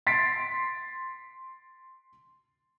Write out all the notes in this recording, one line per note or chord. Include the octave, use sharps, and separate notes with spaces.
C6 A6 B6 C7 D7